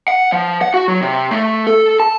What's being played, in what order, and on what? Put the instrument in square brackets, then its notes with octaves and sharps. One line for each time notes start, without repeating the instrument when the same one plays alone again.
[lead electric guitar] F#5
F3
F#5
F#4
F#3
C3
A3
A4
A5